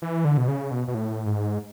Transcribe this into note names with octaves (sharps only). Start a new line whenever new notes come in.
E3
D3
B2
C#3
B2
B2
A2
G#2